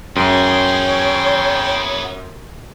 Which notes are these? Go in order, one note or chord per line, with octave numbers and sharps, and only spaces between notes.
F#2 B3 G#4 C#5 G5 C6